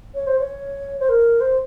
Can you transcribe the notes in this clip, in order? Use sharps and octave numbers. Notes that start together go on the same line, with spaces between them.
C#5
C5
C#5
C5
A#4
C5